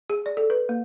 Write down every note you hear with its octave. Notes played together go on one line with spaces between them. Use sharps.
G#4
D5
A4
B4
A#3